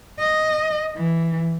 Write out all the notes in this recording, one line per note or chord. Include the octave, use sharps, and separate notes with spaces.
D#5
E3